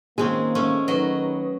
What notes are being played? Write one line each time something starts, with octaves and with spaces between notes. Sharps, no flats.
D#3 G#3 A#3 C4 C#4 G#4
G#3 A3 C#4
D#3 F#3 D#4 B4 D#5